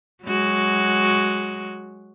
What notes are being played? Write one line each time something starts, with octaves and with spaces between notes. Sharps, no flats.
F#3 G#3 F#4